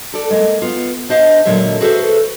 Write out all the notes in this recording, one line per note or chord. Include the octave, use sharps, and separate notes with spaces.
A4 D5
G#3 A#3
B3 F4
D4 C5 D#5 F5
A#2 D3 F#3 G#3 E5
F#4 G#4 A4 B4 C5 E5